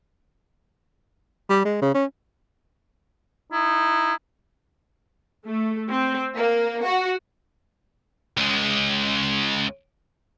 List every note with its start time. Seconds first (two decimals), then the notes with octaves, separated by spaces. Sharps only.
1.49 G3
1.65 G#3
1.82 C#3
1.95 C#4
3.52 D#4 E4
5.46 A3
5.90 C4
6.36 A#3
6.84 F#4
8.37 C#2 G#3